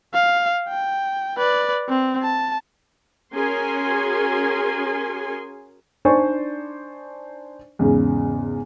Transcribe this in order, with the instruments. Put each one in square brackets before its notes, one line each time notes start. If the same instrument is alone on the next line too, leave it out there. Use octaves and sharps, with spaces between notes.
[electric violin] F5
G5
B4 D5
C4
A5
[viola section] C#4 F#4 G#4 A#4 G#5 C6
[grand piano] D4 D#4 C5 D5 G#5 C#6
E2 G#2 C#3